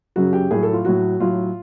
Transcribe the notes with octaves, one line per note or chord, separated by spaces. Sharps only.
F#2 C#3 F#3 F#4
G4
A2 F#3 G#4
A4
F4
A2 F#3 F#4
A2 F#3 F4